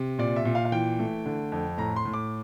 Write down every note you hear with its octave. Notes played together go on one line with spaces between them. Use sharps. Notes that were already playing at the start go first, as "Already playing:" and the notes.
Already playing: C3
A#2 D5
E5
A#2
F5
F5
E3 G5
A3
D3
F2
A2 A#5
C6
A2
D6